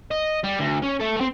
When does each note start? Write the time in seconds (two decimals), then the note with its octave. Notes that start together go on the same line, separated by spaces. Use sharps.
0.11 D#5
0.44 G3
0.59 D2
0.82 C#4
1.00 A3 A4
1.17 A3 C4